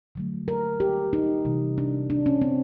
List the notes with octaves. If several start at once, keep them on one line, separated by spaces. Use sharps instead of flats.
D3 F#3 A3
A#4
G4
D#4
C3 E3 G3
D4
D4
C#4
C4